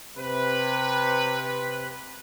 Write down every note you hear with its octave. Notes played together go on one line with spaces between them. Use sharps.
C3 B4